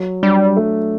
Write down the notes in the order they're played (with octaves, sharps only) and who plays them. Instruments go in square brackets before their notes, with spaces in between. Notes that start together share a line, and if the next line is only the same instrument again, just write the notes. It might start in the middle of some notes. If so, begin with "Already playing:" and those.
Already playing: [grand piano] F#3
[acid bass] G3 [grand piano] D4
[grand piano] A3